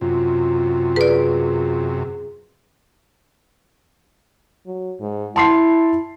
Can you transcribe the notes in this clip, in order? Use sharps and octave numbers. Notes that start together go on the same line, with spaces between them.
F#2 C3 F4
G#4 B4 D5
F#3
G#2
E4 A5 C6 C7